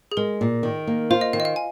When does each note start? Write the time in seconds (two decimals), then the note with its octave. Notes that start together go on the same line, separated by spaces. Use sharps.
0.12 G#4
0.17 G#3 A#4
0.41 A#2
0.63 D#3
0.87 A#3
1.10 F4 C5
1.21 D#5
1.33 D#3 F5
1.40 D#5
1.45 F5
1.56 G#5